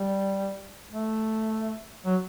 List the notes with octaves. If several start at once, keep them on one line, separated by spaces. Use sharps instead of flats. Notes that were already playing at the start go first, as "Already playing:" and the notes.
Already playing: G3
A3
F#3